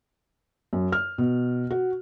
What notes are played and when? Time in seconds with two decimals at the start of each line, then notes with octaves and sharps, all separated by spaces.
0.73 F#2
0.92 F6
1.18 B2
1.71 F#4